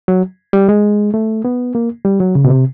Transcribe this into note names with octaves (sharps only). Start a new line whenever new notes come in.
F#3
G3
G#3
A3
B3
A#3
G3
F#3
C#3
B2
C3